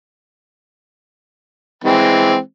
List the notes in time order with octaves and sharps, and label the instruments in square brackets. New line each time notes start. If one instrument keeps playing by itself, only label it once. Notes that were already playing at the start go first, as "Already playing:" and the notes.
[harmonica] E3 G#3 C4